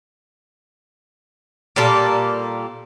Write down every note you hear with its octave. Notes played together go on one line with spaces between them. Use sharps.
A#2 G3 A#3 A4